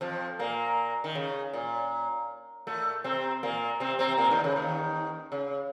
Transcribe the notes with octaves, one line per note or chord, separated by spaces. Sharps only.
F2 F3
A#2 A#3
D#3
C#3
A#2
A2 A3
C3 C4
A#2 A#3
C3 C4
C3 C4
A#2 A#3
D#2 D#3
C#3
D#2 D#3
C#3